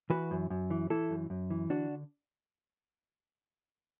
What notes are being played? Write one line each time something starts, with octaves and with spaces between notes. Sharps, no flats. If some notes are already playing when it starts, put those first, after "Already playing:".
E3 F#4 B4
F#2
F#2
E3
E3 E4 A4
F#2
F#2
E3
D3 D4 F#4